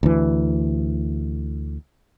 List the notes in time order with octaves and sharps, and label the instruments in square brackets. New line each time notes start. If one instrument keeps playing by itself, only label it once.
[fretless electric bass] D2 E3